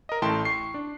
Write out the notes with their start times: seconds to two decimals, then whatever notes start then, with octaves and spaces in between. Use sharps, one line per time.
0.09 A#4 D#5
0.22 A1 A3 E4 G5 A5 C6
0.45 C#6 C7
0.74 D4